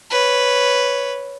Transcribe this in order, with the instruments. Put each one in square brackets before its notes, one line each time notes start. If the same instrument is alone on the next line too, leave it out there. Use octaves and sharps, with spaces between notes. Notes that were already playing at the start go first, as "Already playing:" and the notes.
[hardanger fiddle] B4 C#5